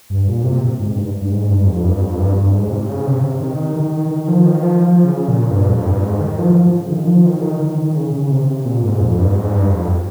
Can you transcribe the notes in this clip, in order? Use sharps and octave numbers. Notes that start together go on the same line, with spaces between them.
G2
A#2
C3
G#2
G2
G2
G#2
G2
F2
G2
F2
G2
G2
G#2
C3
C#3
C3
C3
D#3
D#3
D#3
F3
D#3
F3
F3
C#3
A#2
G2
F2
G2
G#2
D#3
F3
F3
C#3
D#3
F3
D#3
C#3
D#3
D#3
D#3
C#3
C#3
C3
C3
A#2
G#2
F2
G2
G#2
G2
F2